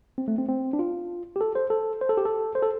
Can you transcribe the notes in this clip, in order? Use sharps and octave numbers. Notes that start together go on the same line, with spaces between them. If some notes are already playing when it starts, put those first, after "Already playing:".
C4
A3
C4
C4
D4
F4
G4
A4
C5
A4
C5
A4
G4
A4
C5
A4